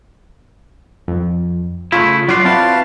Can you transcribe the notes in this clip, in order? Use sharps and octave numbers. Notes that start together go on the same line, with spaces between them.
F2
C#3 A3 E4 F4
F#3 F4 F#4 D5 C6
C4 E4 B4 F5 A5